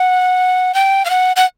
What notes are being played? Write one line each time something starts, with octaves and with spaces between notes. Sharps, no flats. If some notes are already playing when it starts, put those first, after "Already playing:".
Already playing: F#5
G5
F5
F#5
F#5